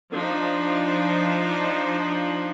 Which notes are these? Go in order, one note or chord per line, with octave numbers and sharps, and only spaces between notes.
F3 D4 D#4